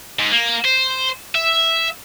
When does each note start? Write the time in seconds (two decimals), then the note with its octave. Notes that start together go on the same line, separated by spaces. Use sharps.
0.19 G#2
0.32 A#3
0.64 C5
1.35 E5